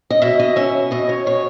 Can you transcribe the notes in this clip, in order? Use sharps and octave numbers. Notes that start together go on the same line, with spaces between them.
D#5
B2 E5
D#5
C#4 E5
B2 D#5
C#5
B2 C#5